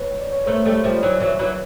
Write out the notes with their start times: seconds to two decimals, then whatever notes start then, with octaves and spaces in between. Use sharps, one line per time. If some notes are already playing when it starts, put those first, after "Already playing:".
Already playing: B4 C#5
0.20 D5
0.33 C#5
0.46 A3 B3 A#4 C5
0.65 G3 A3
0.84 F3 G3
1.03 E3 F#3
1.20 E3 F#3
1.39 E3 F#3